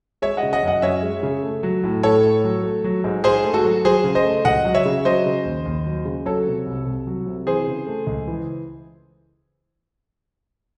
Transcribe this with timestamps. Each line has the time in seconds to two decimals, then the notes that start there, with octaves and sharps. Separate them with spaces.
0.22 G#3 C#5 E5
0.37 D#5 F#5
0.43 C#3
0.53 D#5 F#5
0.63 F#2 D#5 F#5
0.82 F#2 C#5 E5
1.03 G#3
1.23 C#3
1.43 A3
1.63 F#3
1.84 A2
2.03 A2 A4 C#5
2.23 A3
2.44 F#3
2.63 A3
2.84 F#3
3.04 G#2
3.24 G#2 G#4 C5
3.44 A3
3.54 F#4 A4
3.64 F#3
3.85 F#3 G#4 C5
4.04 C#3
4.15 C5 D#5
4.24 A3
4.45 C#2 D#5 F#5
4.65 F#3
4.75 C#5 E5
4.85 C#3
5.05 F#3 C5 D#5
5.26 C#3
5.45 D#2
5.65 D#2
5.86 F#3
6.05 C#3
6.26 F#3 A4 C#5
6.47 C3
6.66 C2
6.86 C2
7.07 F#3
7.26 C3
7.46 E3 G#4 C5
7.68 C#3
7.87 A3
8.07 C#2
8.28 E3